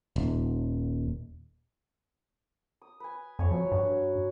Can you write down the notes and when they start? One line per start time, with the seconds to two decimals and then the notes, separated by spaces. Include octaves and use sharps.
0.16 D#1
2.82 D#6
3.00 B4 G#5
3.39 F2 C#5 G#5
3.51 F3 F#3
3.72 G2 C#4 F#4